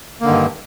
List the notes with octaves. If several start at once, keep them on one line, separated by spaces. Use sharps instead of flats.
G2 D3 D#3 A#3